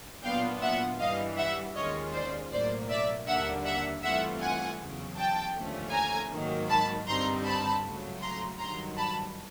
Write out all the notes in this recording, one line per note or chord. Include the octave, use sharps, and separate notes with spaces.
A#2 F#3 B3 D4 F4 F5 G5
E5 F#5
G2 E3 G3 D#5 F5
E5 F#5
D#2 D#3 G#3 C#4 F4 C#5 D#5
C5 D5
B1 A2 F#3 A#3 C5 D5
D5 E5
D#2 D3 G3 A#3 D4 E5 F#5
E5 F#5
G2 E3 A3 C4 F4 E5 F#5
F#5 G#5
E2 C#3 F#3
G5 A5
D#2 D3 F3 A3 C#4
G#5 A#5
G#2 D#3 F#3 A#3
A5 B5
G2 D3 G3 C4 D#4 A#5 C6
A5 B5
C#2 C#3 F#3 A3
A#5 C6
G2 D#3 F#3 A#5 C6
A5 B5